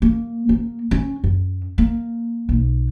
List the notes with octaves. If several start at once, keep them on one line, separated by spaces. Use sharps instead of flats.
A#3
A#3
C#4
F#2
A#3
B1